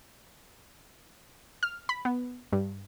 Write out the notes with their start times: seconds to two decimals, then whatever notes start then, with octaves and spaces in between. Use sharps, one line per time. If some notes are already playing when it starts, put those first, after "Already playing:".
1.63 F6
1.89 B5
2.05 B3
2.52 G2